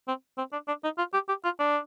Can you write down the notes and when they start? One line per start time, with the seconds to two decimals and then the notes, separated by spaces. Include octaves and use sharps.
0.08 C4
0.38 C4
0.53 D4
0.68 D4
0.84 D#4
0.98 F4
1.14 G4
1.29 G4
1.44 F4
1.59 D4